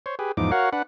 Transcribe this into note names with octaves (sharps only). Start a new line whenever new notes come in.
C5 C#5
G4 G#4 B4
E2 G#2 F3 D#4 D6
F#4 A#4 C#5 F5 F#5
D4 B4 F#5